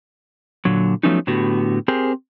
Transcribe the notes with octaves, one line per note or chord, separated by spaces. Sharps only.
A#2 D3 F#3
F3 F#3 A3 B3 C#4 D#4
A2 D3 B3 F#4 G4
C4 G4 G#4 A#4 C5